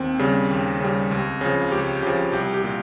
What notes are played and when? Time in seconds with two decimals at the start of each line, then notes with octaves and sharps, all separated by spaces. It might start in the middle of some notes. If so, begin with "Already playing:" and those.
Already playing: D#2 C4
0.19 C#3 G3
0.50 D#2
0.80 C#3 G3
1.11 C#2
1.41 C#3 F3
1.72 C#2 G4
2.02 C#3 F3 G4
2.33 C2 G4
2.54 G4
2.64 A#2